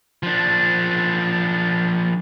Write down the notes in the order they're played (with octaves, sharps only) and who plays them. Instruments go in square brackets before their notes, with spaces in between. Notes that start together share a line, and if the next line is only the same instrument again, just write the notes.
[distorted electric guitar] F3 D4